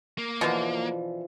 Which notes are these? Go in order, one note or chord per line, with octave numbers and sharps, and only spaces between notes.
A#3
B2 D3 E3 F3